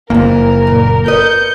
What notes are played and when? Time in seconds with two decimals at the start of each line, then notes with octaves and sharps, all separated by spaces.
0.10 F#1 F2 E3 A#3 A#4
0.67 A#2
1.06 A#4 B4 D#5 G6 C#7